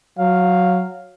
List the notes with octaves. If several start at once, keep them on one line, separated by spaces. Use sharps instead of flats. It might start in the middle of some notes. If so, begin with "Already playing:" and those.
F#3 F5